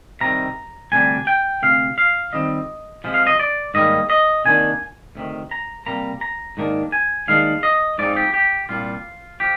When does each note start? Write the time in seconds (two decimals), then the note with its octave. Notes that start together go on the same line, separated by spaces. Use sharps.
0.21 C3 D#3 G3 A#5
0.92 D2 C3 G3 D4 G#5
1.27 G5
1.62 D2 C3 F5
1.98 F5
2.33 F2 D#3 G3 C4 D#5
3.04 C3 F3 G#3
3.14 F5
3.27 D#5
3.39 D5
3.74 G#2 D#3 G3 A#3 D#5
4.10 D#5
4.45 C3 D#3 A#3 D4 G#5
5.15 D2 C3 D#3
5.51 A#5
5.86 C3 G3 A#3 A#5
6.21 A#5
6.57 G#2 D#3 A#3 D4
6.92 G#5
7.28 D#2 D#3 G#3 D4 F5
7.63 D#5
7.98 G#2 F3 G#3 C4 D#4 D5
8.16 G4
8.34 G4
8.69 C2 A#2 G3 D4 F4
9.40 F3 G4